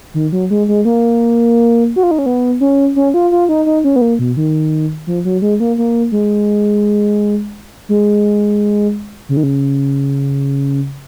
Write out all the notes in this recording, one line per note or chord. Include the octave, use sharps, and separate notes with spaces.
D#3
F#3
G#3
G#3
A#3
F#4
F4
D#4
C#4
B3
C#4
C#4
F4
F4
D#4
D#4
C#4
B3
A#3
B2
D#3
F3
F#3
G#3
A#3
A#3
G#3
G#3
C#3
D#3
C#3